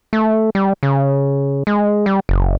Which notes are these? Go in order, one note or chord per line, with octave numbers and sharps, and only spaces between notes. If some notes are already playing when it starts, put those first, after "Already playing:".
A3
G3
C#3
G#3
G3
F#1